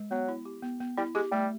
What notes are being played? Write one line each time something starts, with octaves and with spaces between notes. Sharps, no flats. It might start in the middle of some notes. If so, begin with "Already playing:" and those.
Already playing: G#3
F#3 B3
E4
G4
B3
B3
G3 E4
G#3 G4
G3 A3